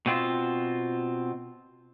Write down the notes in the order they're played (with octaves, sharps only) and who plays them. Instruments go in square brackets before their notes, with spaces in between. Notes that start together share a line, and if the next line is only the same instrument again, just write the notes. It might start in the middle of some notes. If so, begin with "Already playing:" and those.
[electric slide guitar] B2 C4 F4